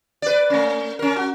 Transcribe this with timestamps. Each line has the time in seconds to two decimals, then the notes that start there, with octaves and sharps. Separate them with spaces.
0.22 B4 D5
0.50 A3 C#4
0.99 C#4 A#4
1.16 F#4